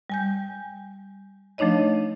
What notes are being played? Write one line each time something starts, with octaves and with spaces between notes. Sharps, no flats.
G3 G#5 G6
F3 A3 D4 D#4 C#5 D#5